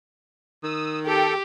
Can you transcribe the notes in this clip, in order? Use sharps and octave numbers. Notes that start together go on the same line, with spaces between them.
D#3 D#6 E6
G4 A4 G5